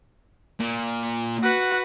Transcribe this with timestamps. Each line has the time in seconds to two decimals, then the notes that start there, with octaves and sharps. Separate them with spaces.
0.60 A#2
1.43 F#4 B4 F#5